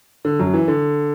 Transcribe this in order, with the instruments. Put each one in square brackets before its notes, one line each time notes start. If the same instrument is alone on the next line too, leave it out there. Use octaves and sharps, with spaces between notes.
[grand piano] D3
F#2 F#3
E3
D3